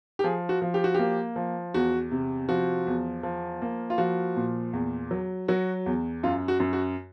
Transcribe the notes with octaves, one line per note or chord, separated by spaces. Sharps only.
G4
F3 G#4
F#4
F3
G4
F#4
A#3 G4
F3
E2 F#4
C3
F3 F#4
E2
F3
A#3
F4
F3 F#4
A#2
E2
F#3
F#3 F#4
E2
F#2 F4
F#4
F#2
F#4